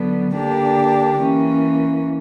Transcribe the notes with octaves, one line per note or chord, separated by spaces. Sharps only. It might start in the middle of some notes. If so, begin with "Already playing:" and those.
Already playing: D3 F#3 B3
D3 A#3 D4 G4
E3 A#3 C#4